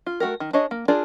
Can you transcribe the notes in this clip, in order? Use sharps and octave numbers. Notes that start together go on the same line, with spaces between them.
F4
A3 F#4 G4 A#4
D#3
D4 G#4 C#5 D#5
A#3
D4 F4 G#4 A#4 D5